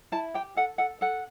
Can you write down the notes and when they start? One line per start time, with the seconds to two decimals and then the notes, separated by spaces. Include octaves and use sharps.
0.12 E4 A5
0.34 G4 G5
0.56 A4 F#5
0.78 A4 F#5
1.01 A4 F#5